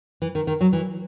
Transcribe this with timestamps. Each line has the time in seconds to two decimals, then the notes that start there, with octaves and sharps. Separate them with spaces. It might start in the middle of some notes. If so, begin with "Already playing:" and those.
0.22 E3
0.35 D#3
0.47 D#3
0.61 F#3
0.73 E3